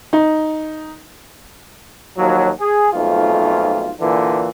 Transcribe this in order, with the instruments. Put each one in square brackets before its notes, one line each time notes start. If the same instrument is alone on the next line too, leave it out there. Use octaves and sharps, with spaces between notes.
[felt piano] D#4
[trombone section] D#2 F3 F#3
G#4
B1 F2 G#2 A3 F4
A#2 D3 E3